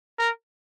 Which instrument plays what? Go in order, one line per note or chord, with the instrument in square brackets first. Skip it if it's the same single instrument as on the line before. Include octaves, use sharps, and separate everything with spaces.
[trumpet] A#4